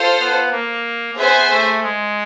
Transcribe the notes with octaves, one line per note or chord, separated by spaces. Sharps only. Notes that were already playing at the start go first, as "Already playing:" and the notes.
Already playing: F4 A4 C5 F5
B3
A#3
B3 G#4 C5 E5 G#5
A3
G#3